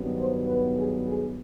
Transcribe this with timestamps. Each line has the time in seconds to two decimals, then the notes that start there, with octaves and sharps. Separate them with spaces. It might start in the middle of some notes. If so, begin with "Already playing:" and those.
Already playing: G2 D#3 F#3 B3
0.19 C5
0.48 B4
0.77 G#4
1.06 G#4